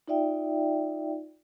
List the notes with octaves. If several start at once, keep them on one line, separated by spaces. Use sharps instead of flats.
D#4 F4 D5 E5 G5